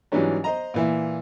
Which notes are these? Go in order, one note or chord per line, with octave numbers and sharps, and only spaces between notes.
G#2 E3 F#3 G3 C#4 D4
C5 D#5 A#5
A#2 E3 E5